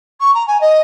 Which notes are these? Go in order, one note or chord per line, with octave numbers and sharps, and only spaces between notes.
C#6
A#5
G#5
D#5